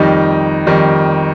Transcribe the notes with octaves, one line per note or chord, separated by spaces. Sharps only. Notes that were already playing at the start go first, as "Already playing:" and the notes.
Already playing: F2 D#3 G3 D#4
F2 D#3 G3